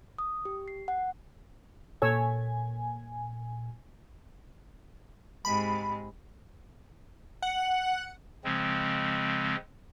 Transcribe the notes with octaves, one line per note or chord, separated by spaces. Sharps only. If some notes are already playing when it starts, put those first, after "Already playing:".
D#6
G4
C7
F#5
A#2 A4 C#5 G#5 E6
G#2 C3 G#3 B5
F#5
C#3 F3 G#3 C4